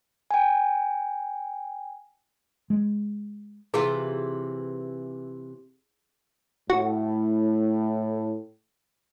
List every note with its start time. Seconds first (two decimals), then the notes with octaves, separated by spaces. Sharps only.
0.31 G5 G#5
2.70 G#3
3.74 C3 E3 E4 F4 G#4
6.70 A2 F#4